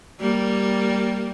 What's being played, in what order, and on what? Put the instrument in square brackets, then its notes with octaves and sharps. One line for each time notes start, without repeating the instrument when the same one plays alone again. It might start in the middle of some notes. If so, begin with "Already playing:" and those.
[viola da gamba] G3 A#3